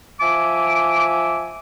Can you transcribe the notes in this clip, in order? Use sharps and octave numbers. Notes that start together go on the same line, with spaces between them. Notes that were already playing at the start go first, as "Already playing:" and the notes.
F3 E5 G#5 D6